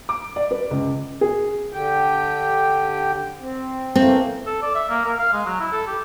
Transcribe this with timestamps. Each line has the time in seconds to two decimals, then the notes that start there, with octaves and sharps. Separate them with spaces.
0.09 D6
0.36 D5
0.51 B4
0.71 C#2
1.21 G#4
1.72 D3 G4 G5
3.40 C4
3.95 E3 A3 A#3 C4
4.47 A4
4.62 D5
4.75 E5
4.90 A#3
5.05 A#4
5.19 F5
5.33 G#3
5.46 F#3
5.60 E4
5.72 A4
5.87 G4